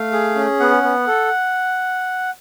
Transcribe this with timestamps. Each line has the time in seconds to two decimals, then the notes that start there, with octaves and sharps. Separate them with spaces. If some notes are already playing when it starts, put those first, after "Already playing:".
Already playing: A3 F5
0.12 G#4
0.35 C#4
0.60 B3 F#5
0.83 B3
1.07 A4